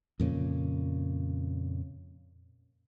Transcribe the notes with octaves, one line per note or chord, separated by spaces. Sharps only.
F2 A#2 C#3